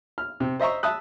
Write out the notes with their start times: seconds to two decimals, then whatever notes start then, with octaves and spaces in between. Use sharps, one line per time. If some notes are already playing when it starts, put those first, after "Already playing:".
0.18 F6
0.40 C3
0.60 C5 D#5 E5 A#5 C#6
0.83 E5 A5 D#6 F#6